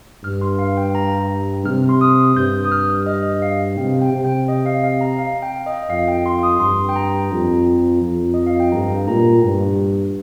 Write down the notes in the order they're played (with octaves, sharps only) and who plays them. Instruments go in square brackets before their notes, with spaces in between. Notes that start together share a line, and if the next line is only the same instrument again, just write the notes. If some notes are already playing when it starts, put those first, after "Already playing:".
[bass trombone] G2 [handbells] F6
[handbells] C6
F5
G5
A#5
[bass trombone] C3 [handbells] F6
[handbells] C6
D#6
[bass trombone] G2 [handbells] G6
[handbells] D#6
F6
D#5
F5
[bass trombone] C3 [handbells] G5
[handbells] G5
[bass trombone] C3
[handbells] G5
D#5
F5
F5
A#5
F5
G5
D#5
[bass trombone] F2 [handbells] F5
[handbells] G5
C6
D#6
[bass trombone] G2 [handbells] C6
[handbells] G5
A#5
[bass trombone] F2
F2
[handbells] D#5
F5
G5
[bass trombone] G2 [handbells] A#5
[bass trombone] A#2 [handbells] A#5
[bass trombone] G2